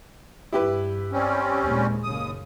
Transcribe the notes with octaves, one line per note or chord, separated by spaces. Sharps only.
G2 E4 G4 B4
G3 C4 C#4
D#2 A#2 G#3
F#1 D#2 C#3 D#6